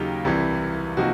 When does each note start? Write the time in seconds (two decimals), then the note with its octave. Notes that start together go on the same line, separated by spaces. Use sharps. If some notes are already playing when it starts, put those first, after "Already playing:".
Already playing: D#2 C#3 F#3 A#3 D#4 G4
0.25 C2 C3 E3
0.97 C3 F3 A#3 D#4 F#4